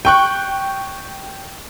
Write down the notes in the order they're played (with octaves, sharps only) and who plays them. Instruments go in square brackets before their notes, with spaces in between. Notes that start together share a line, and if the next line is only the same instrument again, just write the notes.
[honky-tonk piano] G5 C#6 F#6